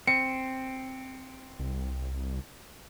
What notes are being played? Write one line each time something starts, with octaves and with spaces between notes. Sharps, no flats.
C4 C#7
C2